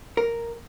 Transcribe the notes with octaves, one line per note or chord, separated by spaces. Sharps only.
A#4